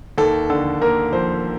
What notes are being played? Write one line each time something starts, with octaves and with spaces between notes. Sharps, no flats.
D#2 A4
D3 A4
A#3 A#4
F3 C5